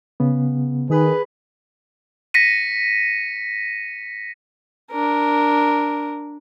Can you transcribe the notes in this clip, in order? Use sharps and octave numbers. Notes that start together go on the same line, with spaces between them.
C#3 B3
D#3 G#4 B4
A#6 B6 C#7 D#7
D4 A#4